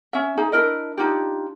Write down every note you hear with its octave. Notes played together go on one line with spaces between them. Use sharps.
C#4 E5
D#4 G#4 G#5
D4 E4 A#4 D#5
D4 D#4 F4 G4